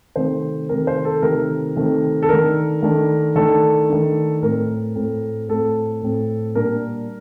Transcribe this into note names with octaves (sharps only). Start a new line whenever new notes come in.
C3 D#3 A3 C4 C5
C3 D#3 A3 C4 A#4
C5
A4
C3 D#3 A3 C4 A#4
C3 D#3 A3 C4
A4
D#3 A3 D4 A#4
D#3 A3 D4
D#3 A3 D4 A4
D#3 A3 D4
A2 A3 C4 A#4
A2 A3 C4
A2 A3 C4 A4
A2 A3 C4
A#2 G3 D4 A#4